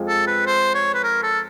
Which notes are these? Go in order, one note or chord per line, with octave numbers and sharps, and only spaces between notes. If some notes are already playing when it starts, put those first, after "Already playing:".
Already playing: F2 F3 G#3
A4
B4
C5
C#5
B4
A#4
A4